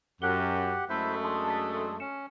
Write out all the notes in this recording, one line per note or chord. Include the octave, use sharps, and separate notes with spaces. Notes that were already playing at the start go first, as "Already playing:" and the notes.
F#2 G4 F#5 F#6 G7
F#2 G#3 A3 E4 C5 E5
D4 G#4 A5 B5 C6
A6 B6
C6
C#4 C#7 E7